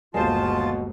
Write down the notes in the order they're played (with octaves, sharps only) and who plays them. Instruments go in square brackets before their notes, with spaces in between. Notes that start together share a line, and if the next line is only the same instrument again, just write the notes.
[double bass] G1 D#2 [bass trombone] B2 [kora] G#3 C5 [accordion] F4 A5